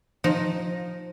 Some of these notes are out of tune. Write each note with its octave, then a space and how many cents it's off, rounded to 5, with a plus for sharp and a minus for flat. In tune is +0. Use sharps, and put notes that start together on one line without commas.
F3 +15 D#4 +0